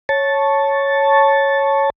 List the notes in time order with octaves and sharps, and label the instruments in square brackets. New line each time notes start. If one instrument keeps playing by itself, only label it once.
[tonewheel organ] C#5 A5